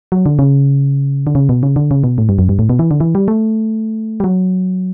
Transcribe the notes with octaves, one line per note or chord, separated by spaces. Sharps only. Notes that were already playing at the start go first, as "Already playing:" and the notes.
F#3
D3
C#3
D3
C#3
B2
C#3
D3
C#3
B2
A2
G2
F#2
G2
A2
B2
E3
D3
E3
G3
A3
G3
F#3